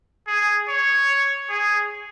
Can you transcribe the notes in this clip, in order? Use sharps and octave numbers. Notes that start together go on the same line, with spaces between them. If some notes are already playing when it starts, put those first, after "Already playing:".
G#4
C#5
G#4